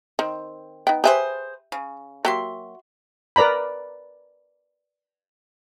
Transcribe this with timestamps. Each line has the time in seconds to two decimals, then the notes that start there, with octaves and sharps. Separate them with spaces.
0.19 D#3 C4
0.87 B3 D#4 G5
1.04 G4 G#4 B4 C5 E5
1.72 C#3
2.25 F#3 A#3 F#4 G4 E5 C6
3.36 A#4 B4 D5 A#5 B5